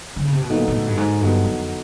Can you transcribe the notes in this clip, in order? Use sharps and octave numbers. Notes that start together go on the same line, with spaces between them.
D3
C#3
C3
B2
A#2 D3 F#3 B3 D#4
A#2
A2
G2
G#2
G2 D3 F#3 B3 D#4
F2